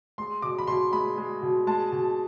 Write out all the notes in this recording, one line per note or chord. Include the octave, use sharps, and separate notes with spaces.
G#3 C6
B2 D6
B5
B2 C6
G#3 B5
G#3
B2
G#3 A5
B2